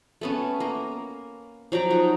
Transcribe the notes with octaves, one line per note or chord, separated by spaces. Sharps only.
A3 B3 C#4
A#3 A#5
F3 F#3 G5 A#5
D#4 F#4